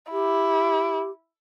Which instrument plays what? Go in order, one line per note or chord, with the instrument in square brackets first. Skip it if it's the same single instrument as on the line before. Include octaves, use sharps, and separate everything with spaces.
[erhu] E4 [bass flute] G4